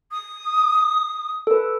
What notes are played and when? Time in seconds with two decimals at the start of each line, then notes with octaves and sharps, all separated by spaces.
0.12 D#6
1.47 A4 B4